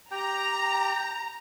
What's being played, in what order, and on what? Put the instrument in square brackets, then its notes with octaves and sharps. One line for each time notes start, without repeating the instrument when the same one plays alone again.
[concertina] G4 G5 [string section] A#5